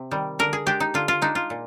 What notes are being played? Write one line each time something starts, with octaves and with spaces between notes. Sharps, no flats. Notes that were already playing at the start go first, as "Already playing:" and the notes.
Already playing: C3
D#3 G3
D3 A#4
G#4
G#3 D4 G4
D#4
D3 F4
F4
G#3 D4 D#4
F4
A#2